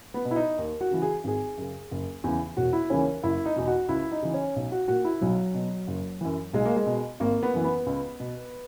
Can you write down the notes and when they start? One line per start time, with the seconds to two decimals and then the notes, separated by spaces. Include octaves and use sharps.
0.14 B3
0.25 B2
0.31 E4
0.36 D#4
0.58 D#2
0.81 F#4
0.91 C#3 E3
1.02 G#4
1.24 G#1 G#4
1.58 F#2 C#3
1.91 F#1
2.24 E2 C#3 E3
2.57 E1 F#4
2.73 E4
2.90 D#2 C#3 E3 C#4
3.23 F#1 E4
3.46 D#4
3.56 E2 B2
3.67 F#4
3.89 C#2 E4
4.12 D#4
4.22 C#3 E3
4.34 C#4
4.56 B1
4.72 F#4
4.88 A#2 F#4
5.05 E4
5.21 B1 F#3
5.54 B2
5.87 F#1
6.21 F#2 E3
6.53 B1 G#3
6.66 A#3
6.76 G#3
6.86 B2
7.20 G#1 A#3
7.43 B3
7.53 F#2 E3
7.64 B3
7.86 C#2
8.20 B2